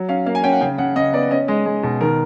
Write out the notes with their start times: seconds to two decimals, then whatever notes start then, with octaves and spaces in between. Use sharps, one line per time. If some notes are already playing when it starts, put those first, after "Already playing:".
Already playing: F#3
0.09 C#4 F5
0.26 A#3 F5
0.35 G#5
0.44 C#4 G5
0.52 F#5
0.61 C#3 G5
0.78 C#3 F#5
0.96 C#3 D#5
1.13 B3 D5
1.31 C#4 D#5
1.48 G#3 D#5
1.66 G#3
1.83 B2
2.01 D#3 A#4